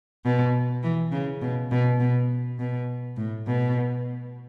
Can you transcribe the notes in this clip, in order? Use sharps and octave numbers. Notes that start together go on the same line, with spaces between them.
B2
E3
C#3
B2
B2
B2
B2
A2
B2